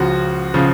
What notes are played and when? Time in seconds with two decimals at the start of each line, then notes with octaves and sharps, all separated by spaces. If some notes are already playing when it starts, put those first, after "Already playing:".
Already playing: C#2 C#3 F3 F#4
0.54 C#3 F3